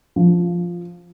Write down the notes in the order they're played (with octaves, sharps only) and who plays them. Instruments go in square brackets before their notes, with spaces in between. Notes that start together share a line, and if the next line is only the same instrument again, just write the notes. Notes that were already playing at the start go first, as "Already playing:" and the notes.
[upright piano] F3